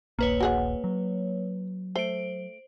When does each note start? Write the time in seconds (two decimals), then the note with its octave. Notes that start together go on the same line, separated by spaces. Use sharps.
0.19 D#1 A#1 A#3 B4 C#5
0.40 F#4 G#4 F#5
0.84 F#3
1.96 A3 C5 D7